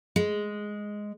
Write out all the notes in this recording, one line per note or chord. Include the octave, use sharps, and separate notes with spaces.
G#3